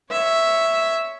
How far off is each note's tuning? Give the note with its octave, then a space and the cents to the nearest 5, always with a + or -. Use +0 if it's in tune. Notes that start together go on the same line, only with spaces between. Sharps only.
C#5 +0 E5 +0